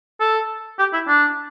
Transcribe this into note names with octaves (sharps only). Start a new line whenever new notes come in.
A4
G4
E4
D4